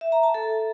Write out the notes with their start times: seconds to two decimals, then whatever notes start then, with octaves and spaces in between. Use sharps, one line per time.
0.01 E5
0.12 A#5
0.23 A5
0.34 A4